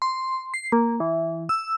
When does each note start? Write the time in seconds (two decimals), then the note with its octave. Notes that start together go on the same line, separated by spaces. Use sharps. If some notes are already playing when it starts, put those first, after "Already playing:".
0.02 C6
0.54 C7
0.72 A#3
1.00 E3
1.49 E6